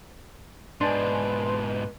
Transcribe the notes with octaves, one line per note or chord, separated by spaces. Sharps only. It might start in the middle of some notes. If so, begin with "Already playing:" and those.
G#2 B2 D4 B4 G#5 A5 C6